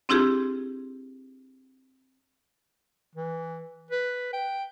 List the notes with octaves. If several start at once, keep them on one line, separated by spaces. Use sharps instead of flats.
C4 D4 E4 F4 G4 G#4
E3
B4
G5